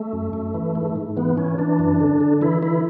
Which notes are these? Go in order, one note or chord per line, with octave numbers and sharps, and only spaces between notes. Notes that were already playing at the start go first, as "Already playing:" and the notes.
Already playing: A3
F#2
F#2
E3
G#2
G#2
E3 B3
E3 C#4
E3 D4
F#2
D3
D3
E3 E4
E3 E4